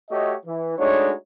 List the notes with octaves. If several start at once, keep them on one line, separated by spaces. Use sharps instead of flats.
A3 F#4 G4 C#5 D#5
E3
G#3 A3 D4 D#4 F#4 C#5